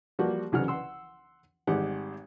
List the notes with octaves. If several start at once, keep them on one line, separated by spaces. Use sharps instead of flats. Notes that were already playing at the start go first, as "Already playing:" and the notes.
F3 G3 A#3 F#4
C2 C#3 F#3 F#5 F6
F#5 C6 E6
G#1 G3 G#3 G4 F#5